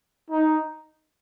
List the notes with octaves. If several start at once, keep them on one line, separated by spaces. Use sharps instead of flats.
D#4